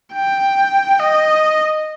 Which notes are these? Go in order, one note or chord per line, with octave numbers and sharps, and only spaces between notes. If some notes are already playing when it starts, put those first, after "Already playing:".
G5
D#5